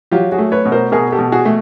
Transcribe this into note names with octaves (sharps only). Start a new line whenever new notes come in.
F#3 F4 G4
F#4 G#4
A3
B4 C#5
B2
A#4 C5
B2 G#4 A#4
G4 A4
B2
F#4 G#4
A3